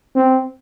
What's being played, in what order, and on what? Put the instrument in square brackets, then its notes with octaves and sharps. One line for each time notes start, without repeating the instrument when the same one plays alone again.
[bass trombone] C4